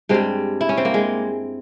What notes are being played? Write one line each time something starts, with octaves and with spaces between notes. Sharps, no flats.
G2 G3 G#3 C4
E4
C#4
C4
A#3
G#3